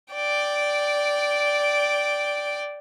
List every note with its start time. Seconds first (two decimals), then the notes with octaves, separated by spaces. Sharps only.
0.14 D5 G5